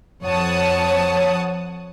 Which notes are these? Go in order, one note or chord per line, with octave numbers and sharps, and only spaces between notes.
F2 C#5 F#5 A5 D#6